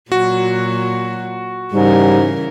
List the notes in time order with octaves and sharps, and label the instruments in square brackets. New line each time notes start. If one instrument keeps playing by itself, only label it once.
[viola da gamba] A#2 F#3 [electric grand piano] F#4
[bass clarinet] G#2 [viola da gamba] C#3 E3 A#4 [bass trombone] G3